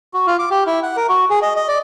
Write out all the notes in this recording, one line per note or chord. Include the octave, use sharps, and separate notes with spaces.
F#4
F4
D6
G4
E4
F#5
A#4
F#4
G#4
D#5
D#5
D5